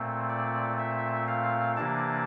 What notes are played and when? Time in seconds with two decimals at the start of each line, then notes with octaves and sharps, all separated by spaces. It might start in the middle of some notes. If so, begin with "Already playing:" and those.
Already playing: A#2 A3 C4
0.29 D5
0.78 E5
1.28 F5
1.77 C3 E3 A#3 D4 A5